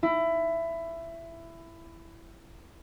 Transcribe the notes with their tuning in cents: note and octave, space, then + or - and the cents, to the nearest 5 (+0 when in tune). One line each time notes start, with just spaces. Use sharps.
E4 +15